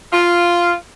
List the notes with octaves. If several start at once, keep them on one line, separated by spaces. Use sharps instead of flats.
F4